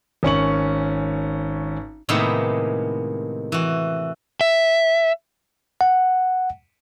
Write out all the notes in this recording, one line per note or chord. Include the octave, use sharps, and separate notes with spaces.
G#1 C#4 C#6 F#7
A2 C3 D#3 G#3 A#3 B3
E3 F#4
E5
F#5